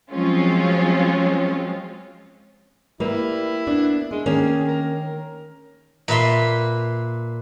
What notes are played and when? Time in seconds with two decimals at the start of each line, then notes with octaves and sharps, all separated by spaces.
0.11 F3 F#3 G#3 C4 C#4 F4
3.00 G3 A#3 E4 B4
3.67 B3 D4
4.11 G#3 D4
4.26 D#3 A#3 C#4 G#4
4.67 A#4
6.08 A#2 B4 E5 C6